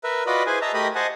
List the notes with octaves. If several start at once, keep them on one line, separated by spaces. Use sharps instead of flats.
A#4 B4 E5
F4 F#4 B4 D5 D#5 B5
E4 G#4 B4 C5 G#5
D#5 E5 A5 A#5
A3 G4 A#4 D#5 B5 D#6
C5 D#5 F#5 G#5 A5